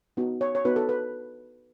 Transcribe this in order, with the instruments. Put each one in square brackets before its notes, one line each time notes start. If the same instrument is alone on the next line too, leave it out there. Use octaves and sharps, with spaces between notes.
[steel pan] B3 D#4 F#4
C#5
C#5
B3 D#4 F#4 B4
A4
B4